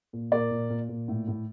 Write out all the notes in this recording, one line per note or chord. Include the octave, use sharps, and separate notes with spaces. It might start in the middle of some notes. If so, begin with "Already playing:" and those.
A#2
A#2 A#4 D5
A#2
A#2
A#2
A2
A2